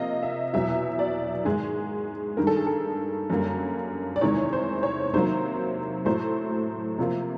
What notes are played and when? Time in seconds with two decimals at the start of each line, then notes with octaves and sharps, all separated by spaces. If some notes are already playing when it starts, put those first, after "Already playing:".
Already playing: C3 F3 A#3 D#5 F5
0.23 E5
0.53 E2 B2 F#3 E5
0.99 D5
1.45 G#2 D#3 G#3 G#4
2.37 G2 D#3 G3 A#4
2.47 A4
2.56 G#4
2.67 A4
3.30 F#2 D3 G3 A#3
4.16 D5
4.21 E2 C3 D#3 G#3 C#5
4.53 C5
4.83 C#5
5.13 C3 D#3 F#3 A#3 C5
6.05 A2 F#3 A3 C5
6.98 C3 F3 A#3